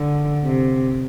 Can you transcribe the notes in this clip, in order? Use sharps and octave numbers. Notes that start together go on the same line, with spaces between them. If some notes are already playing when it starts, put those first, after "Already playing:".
Already playing: D3
C3